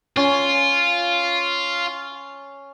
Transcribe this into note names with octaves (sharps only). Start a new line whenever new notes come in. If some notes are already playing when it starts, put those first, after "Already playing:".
C#4 F4